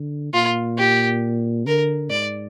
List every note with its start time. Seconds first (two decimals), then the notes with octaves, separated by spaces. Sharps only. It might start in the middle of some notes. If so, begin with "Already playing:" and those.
Already playing: D3
0.33 A#2 F4
0.78 G4
1.66 D3 A#4
2.10 G#2 D5